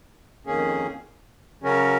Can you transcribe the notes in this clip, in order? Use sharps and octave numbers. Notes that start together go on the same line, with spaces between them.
F2 D#3 A#3 C#4 G#4
C#3 F#3 C#4 F#4 A#4